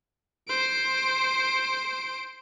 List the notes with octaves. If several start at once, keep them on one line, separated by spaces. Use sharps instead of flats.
C5 D7